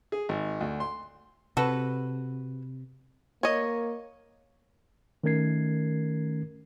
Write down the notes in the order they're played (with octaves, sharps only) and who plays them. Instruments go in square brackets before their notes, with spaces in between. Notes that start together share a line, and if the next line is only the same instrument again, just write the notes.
[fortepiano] G#4
G#1
D2
C6
[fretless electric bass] C3 [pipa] F#4 A4 B4
[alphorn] A#3 [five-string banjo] C#5 D#5
[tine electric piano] D#3 A3 C#4 A#4 G#6 C7